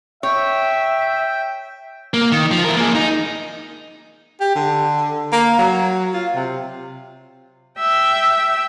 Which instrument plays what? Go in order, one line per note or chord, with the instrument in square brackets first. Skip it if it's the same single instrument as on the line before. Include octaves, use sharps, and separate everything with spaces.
[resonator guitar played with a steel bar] C#5 [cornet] E5 [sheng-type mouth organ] G5
[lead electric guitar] A#3
D#3
F3
E4 A#4
A#3 G#4
D#4
[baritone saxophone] G4
D3
A#3
F#3
F4
C3
[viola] E5 G5